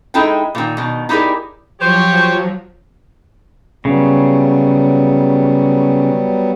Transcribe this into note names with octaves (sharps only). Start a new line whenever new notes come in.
G#3 D#4 E4 A4 G5
A#2 D#3
B2 D#3
D#4 E4 G4 G#4 A#4 D5
F3 F#3 G4 C5 C#5
C#3 F#3 G3 B3